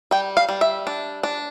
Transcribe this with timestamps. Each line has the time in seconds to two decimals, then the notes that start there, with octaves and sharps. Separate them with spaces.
0.11 G3 G5
0.37 F5
0.49 G3
0.61 E5
0.87 D4
1.23 D4